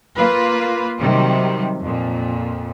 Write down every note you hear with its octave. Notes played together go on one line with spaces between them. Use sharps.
A#3 F4 B4
C3 D#3 F#3 G3
F2 A#2